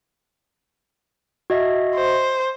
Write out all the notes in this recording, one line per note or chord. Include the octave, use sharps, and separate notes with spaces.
F#4 D#5 E5
C5